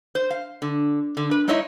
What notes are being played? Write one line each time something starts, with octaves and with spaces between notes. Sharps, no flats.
C5
F5
D3
D3
B4
G#3 D#4 E4 C#5 D#5 E5